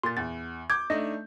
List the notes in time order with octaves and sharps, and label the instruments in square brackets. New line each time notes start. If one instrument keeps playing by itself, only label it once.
[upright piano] A#2 [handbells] C6 A6
[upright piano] E2 [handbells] A6
[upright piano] D6 G6 [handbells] G#6
[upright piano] A3 D4 D#4 [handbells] D#5